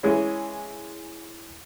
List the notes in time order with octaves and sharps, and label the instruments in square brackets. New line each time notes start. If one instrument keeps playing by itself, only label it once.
[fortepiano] E3 G#3 C#4